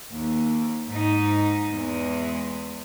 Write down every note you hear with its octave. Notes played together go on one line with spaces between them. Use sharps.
D#2
G#2 D#4
E2 G#3